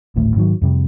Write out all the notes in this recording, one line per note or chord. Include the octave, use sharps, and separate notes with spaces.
G#1 D2 A2
G#2 D#3 F3 F#3
F2 C3 G3